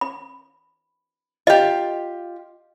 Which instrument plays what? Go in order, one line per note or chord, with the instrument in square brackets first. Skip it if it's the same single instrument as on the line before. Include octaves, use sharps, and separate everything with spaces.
[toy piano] B5
[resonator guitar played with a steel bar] F4 G4 [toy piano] D#5